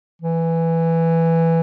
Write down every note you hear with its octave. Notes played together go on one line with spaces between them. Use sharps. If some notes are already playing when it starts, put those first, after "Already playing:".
E3